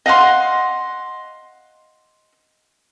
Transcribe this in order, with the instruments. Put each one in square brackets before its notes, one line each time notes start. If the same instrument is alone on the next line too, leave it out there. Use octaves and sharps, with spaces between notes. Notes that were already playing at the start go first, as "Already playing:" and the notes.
[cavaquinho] D#5 F5 F#5 C6